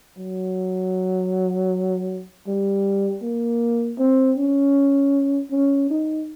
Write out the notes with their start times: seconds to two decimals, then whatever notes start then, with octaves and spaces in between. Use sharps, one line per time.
0.18 F#3
2.47 G3
3.23 A#3
3.99 C4
4.38 C#4
5.51 C#4
5.90 D#4